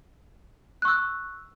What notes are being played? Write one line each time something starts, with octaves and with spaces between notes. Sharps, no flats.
C#6 E6 F#6